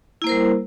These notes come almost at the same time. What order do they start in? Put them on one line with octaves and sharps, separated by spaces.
E4 A#3 C5 A#4 G3